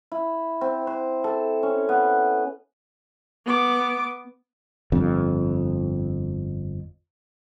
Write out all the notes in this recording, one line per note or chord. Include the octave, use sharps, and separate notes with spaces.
E4
C4
C5
A4
C#4
B3
B3 D6
G1 F2